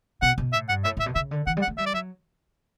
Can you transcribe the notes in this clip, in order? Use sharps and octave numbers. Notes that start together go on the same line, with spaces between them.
B2 F#5
B2
A2 E5
G2 F#5
A2 E5
A2 E5
B2
C#3 E5
D3
E3 F#5
G3
F#5
A3
G3 E5
D5
F#3 E5